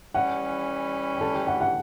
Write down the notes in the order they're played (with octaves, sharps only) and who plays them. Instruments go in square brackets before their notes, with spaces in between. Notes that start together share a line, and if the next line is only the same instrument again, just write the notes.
[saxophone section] E3 G3 C#4 [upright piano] F#5
[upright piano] G5
A4 A5
G4 G5
F#5
F#5